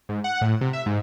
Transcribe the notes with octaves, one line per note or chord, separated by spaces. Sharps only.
G#2
F#5
A2
C3
E5
G#2